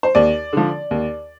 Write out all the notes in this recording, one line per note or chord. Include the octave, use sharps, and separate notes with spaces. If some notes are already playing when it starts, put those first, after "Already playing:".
C5
D#2 D5
D3 F3
D#2